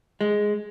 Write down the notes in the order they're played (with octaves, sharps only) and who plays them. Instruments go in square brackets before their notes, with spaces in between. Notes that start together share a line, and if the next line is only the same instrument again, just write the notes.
[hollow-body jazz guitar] G#3